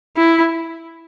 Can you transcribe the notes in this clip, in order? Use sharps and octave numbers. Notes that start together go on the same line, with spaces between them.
E4